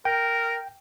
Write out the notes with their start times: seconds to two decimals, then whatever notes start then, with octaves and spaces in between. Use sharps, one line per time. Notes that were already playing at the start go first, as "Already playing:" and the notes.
0.05 A#4 G5